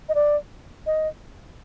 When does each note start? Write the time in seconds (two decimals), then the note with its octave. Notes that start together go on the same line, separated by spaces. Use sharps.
0.09 D#5
0.15 D5
0.86 D#5